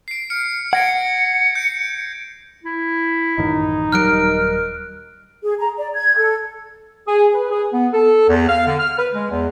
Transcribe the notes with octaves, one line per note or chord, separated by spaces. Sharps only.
C7 D7
F6 C#7
F#5 G#6 A#6 C#7 D7
G6 D7
E4
A1 F#2 D#3 D#4
D#1 F#3 G3 A#4 F6 F#6 D7
G#4
A#5
D5
G#6
A4
G#4
B4
G#4
B3
A4
E2
F5
D3
F6
B4
G#3
E2